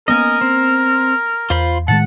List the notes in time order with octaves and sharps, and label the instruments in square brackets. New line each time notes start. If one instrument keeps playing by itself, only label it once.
[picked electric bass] A#3 B3 C#4 [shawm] A#4 [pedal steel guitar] D#5 G#5
[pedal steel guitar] C4
[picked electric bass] E2 [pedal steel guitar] F4 C5 B5
[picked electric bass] A2 D#3 G#3 [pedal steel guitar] F#5 [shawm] A5